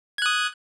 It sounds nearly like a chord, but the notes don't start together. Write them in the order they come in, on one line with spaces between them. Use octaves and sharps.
G#6 F#6 D#6